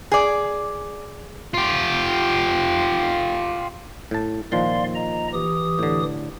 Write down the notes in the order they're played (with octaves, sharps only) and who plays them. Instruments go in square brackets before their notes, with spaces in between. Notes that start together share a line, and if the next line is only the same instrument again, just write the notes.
[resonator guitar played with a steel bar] G#4 D5
[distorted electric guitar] F4 G4
[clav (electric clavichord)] A2 A5
[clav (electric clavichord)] A#2 D#3 F3 [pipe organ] D5 F5 C6
[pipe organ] D#5 A#5
E3 G4 D#6
[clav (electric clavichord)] A2 D3